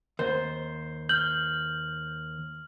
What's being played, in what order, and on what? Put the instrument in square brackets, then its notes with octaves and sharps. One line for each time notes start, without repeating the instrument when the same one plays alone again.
[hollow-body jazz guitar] D#2 [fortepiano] C5
[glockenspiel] F6 F#7 [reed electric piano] G6